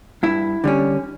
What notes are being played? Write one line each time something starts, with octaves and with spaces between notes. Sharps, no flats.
G2 E4
D3 G3 C#4